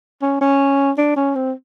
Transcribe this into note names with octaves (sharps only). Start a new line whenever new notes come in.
C#4
C#4
D4
C#4
C4